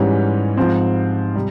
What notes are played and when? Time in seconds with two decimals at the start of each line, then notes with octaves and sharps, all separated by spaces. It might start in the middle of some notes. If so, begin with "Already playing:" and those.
Already playing: G#2 E3 G3 C#4
0.57 G#2 F3 C4
1.35 C3 G3